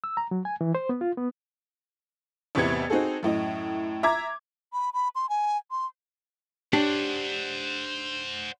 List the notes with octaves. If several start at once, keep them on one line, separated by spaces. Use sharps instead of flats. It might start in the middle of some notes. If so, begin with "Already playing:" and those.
E6
A#5
F#3
G#5
E3
C5
B3
F4
B3
A1 E2 C3 B3 G#6 C#7
C4 D#4 F#4 G#4 A4
F#2 A2 D#5
E5 A#5 D6 G#6
B5
B5
C6
G#5
C6
D4 G4 C5 C#5 F#5